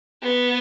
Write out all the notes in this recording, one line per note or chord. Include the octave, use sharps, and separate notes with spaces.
B3